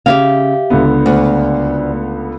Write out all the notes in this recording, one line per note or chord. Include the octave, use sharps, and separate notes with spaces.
C#3 G4 E5 F5
C#2 D3 B3
D2